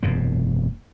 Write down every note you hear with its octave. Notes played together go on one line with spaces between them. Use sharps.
E1 F#2 C3 A#3